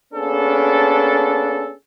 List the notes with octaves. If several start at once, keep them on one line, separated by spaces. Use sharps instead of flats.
A#3 B3 C#4 D4 G#4 A4